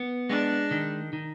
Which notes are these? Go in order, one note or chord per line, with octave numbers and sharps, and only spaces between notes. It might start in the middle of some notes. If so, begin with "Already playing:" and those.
Already playing: B3
G#3 D4
D#3
D#3